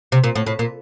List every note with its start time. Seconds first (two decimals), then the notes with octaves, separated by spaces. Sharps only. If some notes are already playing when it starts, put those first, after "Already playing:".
0.12 C3
0.24 A#2
0.36 A2
0.47 A2
0.59 A#2